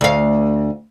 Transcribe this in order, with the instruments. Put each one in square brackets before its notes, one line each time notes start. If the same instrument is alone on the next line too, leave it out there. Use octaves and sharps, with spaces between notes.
[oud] D2 F5